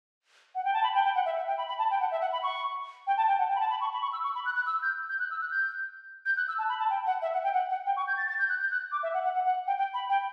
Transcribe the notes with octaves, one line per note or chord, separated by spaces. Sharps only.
F#5
G5
A5
B5
G5
G5
F#5
E5
E5
G5
B5
B5
A5
G5
F#5
E5
F#5
B5
C#6
G5
A5
G5
F#5
G5
B5
A5
B5
C#6
B5
C#6
E6
C#6
B5
F#6
F#6
E6
G6
G6
F#6
E6
F#6
G6
G6
F#6
E6
A5
B5
A5
G5
F#5
E5
F#5
G5
F#5
F#5
G5
C#6
G6
A6
A6
G6
F#6
G6
F#6
D6
E5
F#5
F#5
F#5
F#5
G5
G5
B5
G5